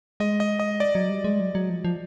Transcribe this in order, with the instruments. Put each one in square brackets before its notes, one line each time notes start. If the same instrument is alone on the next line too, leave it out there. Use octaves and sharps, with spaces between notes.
[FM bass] G#3 [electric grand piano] D#5
[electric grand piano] D#5
D#5
D5
[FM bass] F#3
G3
G#3
F#3
F#3
F3
F3